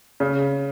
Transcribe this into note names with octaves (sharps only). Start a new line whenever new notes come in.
C#3